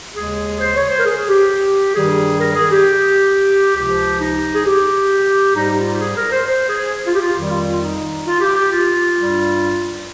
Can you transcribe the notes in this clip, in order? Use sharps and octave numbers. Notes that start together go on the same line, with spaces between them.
D#2 C#3 G#3 G#4
C5
C#5
C5
A#4
G#4
G4
G2 D#3 G3 G#4
A#4
G#4
G4
C#2 C3 F3 G4
D#4
G#4
G4
G#2 G3 D#4
F4
G4
G#4
A#4
C5
C5
G#4
F4
G4
F4
F2 D#3 G3
F4
F4
D#4
F4
G4
G4
F4
G2 G3